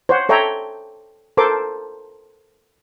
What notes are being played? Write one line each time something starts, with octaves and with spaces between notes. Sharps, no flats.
C5 C#5 F#5
A4 C#5 E5 G5 A#5
A4 A#4 C5 C6 D6